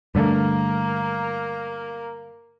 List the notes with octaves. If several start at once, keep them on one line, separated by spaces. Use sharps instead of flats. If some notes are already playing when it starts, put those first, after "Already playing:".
G2 D3 A3 A#3 A#4